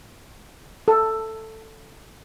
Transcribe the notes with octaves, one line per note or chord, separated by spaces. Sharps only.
A4